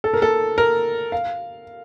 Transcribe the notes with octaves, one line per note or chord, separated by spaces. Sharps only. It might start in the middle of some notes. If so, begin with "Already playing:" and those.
A4
A#4
A4
A#4
F5